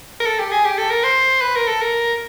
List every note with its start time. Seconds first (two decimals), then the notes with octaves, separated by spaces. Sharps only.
0.20 A#4
0.26 A4
0.39 G4
0.52 G#4
0.65 G4
0.78 A4
0.90 A#4
1.03 C5
1.41 B4
1.55 A#4
1.68 A4
1.82 A#4